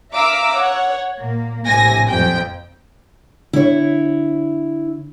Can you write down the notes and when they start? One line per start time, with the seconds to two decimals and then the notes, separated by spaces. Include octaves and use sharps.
0.13 E5 F5 A#5 D6 E6
0.53 C#5 F#5
1.19 A#2 A#3
1.66 A#1 A2 C3 G#5 A#6
2.07 F2 G5
3.53 D3 E4 C#5